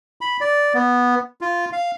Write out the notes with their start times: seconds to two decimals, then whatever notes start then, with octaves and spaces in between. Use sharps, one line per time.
0.21 B5
0.41 D5
0.74 B3
1.41 F4
1.73 F5